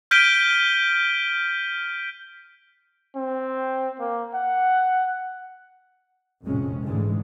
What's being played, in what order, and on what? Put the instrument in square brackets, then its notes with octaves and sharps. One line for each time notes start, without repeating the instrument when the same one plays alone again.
[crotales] F6 G6 B6 D7 D#7 G7
[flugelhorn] C4
A#3
F#5
[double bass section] A#1 F2 A2 C3 G#3 C#4
G#2 D3 E3 G#3 A3